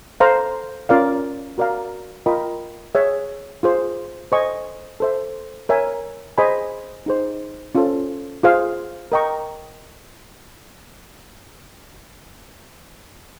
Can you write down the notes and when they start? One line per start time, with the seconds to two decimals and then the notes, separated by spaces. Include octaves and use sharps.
0.20 A4 C5 F5 A#5
0.89 C#4 F4 A#4 D5 F5
1.58 F#4 A#4 D5 F5 A#5
2.26 F4 A#4 D#5 G5 B5
2.95 G#4 C#5 E5
3.63 F4 G#4 C5
4.32 A4 C5 D#5 G#5 C#6
5.00 A4 C5 E5
5.69 A#4 C#5 E5 G#5
6.38 G#4 C5 D#5 G#5 B5
7.06 D#4 G#4 C5
7.75 C#4 F4 A4 C5
8.43 F4 G#4 C5 F5
9.12 A#4 D#5 G5 A#5 C#6